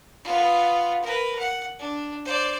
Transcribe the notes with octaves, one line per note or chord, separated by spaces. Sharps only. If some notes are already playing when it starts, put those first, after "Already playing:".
B3 F4
A#4 B4
F#5
D4
C5 D5